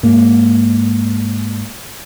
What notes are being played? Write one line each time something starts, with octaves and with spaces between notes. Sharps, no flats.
G#2 A#3